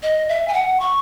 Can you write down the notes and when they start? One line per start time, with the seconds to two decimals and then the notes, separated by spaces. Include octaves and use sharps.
0.03 D#5
0.29 E5
0.48 G#5
0.53 F#5
0.80 C#6